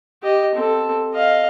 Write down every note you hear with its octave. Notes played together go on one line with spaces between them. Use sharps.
G4 D#5
C4 A4
D#5 F5